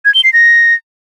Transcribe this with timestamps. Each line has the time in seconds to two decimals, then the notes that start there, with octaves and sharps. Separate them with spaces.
0.05 G#6
0.14 G7
0.24 C7
0.33 A#6